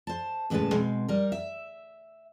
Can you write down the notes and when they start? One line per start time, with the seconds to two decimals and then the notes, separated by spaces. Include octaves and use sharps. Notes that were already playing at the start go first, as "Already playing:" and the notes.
0.07 C5 A5
0.50 E2 A2 C#3 G#3 B4 A5
0.72 B2 G#3 C4
1.08 G3 A#4
1.32 E5